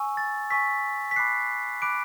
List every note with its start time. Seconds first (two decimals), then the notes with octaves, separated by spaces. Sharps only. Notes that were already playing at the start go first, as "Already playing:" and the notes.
Already playing: G#5 C#6 E6
0.17 A6
0.50 G#5 C#6 E6 B6
1.11 B6
1.16 B5 D6 F#6 C7
1.82 B5 D6 F#6 D7